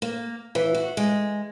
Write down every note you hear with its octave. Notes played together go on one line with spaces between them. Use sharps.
A#3
E3
F#4
G#3